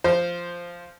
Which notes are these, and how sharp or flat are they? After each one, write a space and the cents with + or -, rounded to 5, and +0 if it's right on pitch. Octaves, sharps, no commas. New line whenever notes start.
F3 -5 C5 +0